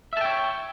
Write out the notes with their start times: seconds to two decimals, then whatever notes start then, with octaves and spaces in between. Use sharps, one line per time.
0.13 E5
0.17 A5
0.21 G5
0.25 C#5